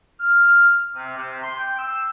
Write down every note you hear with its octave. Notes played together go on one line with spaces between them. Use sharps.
F6
C3
C3
C6
G5
E6